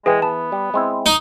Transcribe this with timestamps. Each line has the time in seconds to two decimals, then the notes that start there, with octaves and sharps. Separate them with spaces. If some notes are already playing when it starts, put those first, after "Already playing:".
0.06 E3 G#3 G#4 B4 G5
0.22 B3 A5
0.52 G3
0.74 G#3 C4 E4
1.06 D#4